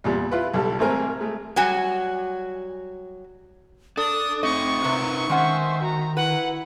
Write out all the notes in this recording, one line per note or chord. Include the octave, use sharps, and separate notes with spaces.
E2 A#2 G3
E4 F4 B4
B1 G3 A4
G#1 A3 C4 A#4 G#5
G#3 A3
F#3 G3 F#4 G#5
D4 A4 D#6
A3 C4 D#4 D#5 C#6
C3 D#4 A#4 B4
D#3 G#3 C#4 C5 E5 F#5
F#4 A#5
E4 B4 F#5